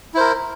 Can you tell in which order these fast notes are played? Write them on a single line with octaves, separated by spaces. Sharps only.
E4 C5 A#4